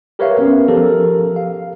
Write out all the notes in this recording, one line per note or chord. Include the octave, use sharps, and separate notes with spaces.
G4 A#4 B4 C#5 E5 F5
B3 C#4 A#4
F3 G4 A4 A#4
F5